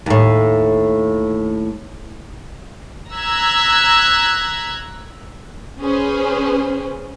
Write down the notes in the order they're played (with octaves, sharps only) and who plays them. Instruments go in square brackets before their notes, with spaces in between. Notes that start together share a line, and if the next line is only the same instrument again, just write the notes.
[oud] D#2 A2
[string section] A#5 E6 F#6 G#6 B6
C#4 G#4 B4 C5